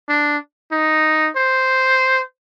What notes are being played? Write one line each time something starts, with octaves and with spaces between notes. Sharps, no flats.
D4
D#4
C5